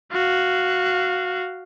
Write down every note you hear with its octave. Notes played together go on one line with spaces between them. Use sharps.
F#4 F5